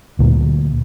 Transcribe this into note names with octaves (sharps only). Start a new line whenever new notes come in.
D2 A#2